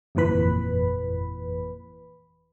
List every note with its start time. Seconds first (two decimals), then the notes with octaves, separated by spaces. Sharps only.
0.15 G1 F2 A#2 E3 B4 B5